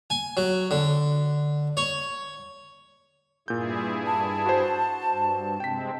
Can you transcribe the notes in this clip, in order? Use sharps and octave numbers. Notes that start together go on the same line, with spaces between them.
G#5
F#3
D3
C#5
G2 A#2 E4 G#4 G6
A5
F#4 C5
G2
C3 G#3 C4 G5 B6